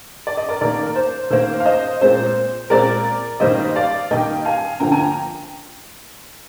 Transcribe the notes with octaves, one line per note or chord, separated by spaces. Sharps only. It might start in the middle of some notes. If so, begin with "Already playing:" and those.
D5
D#5
A#4 D5
D#3 A#3 A#4 D5
A#4
C5
D#3 A#3 C5
F5
C5 D#5
A#2 G#3 C4 C5
A#2 G#3 C4 A#4 D5
D#3 G3 A#3 C5 D#5
D5 F5
D#3 G3 A#3 D#5 G5
F5 G#5
D3 F3 A#3 G5 A#5
G#5
G5 A#5